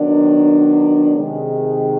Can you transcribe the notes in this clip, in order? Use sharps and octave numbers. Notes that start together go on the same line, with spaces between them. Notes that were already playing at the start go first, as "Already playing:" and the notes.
Already playing: D#3 F#3 B3 D4
C3 D#3 G#3